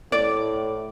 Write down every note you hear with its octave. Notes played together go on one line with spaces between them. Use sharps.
A2 D5